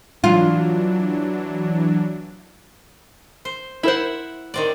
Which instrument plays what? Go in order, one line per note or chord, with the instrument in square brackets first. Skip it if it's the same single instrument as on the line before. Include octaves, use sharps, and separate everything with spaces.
[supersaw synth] E3 F#3 D4 [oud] F4
[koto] C5
[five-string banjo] E4 A#4 C5 [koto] E5 F#5
[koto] D#3 C4 D5